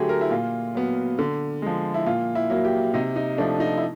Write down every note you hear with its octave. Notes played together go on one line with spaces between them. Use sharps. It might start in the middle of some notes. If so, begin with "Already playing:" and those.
Already playing: D3 F#3 A3 G4 G#4
A#4
E4
A#2 F4
F#3 B3
D3
F3 G#3
E4
A#2 F4
E4
F#3 A#3
G4
C3 D#4
D#4
F3 A3 D4
D#4
E4